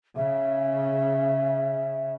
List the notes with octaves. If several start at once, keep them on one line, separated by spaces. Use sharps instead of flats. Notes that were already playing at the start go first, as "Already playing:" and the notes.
C#3 E5